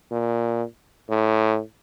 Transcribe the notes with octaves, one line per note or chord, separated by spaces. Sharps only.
A#2
A2